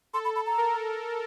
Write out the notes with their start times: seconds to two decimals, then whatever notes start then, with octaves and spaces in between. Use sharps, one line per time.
0.13 A4 C6
0.25 B5
0.36 B5
0.46 A#5
0.57 A#4